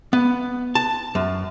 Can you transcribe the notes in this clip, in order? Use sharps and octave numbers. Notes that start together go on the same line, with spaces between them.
B3
A5
F#2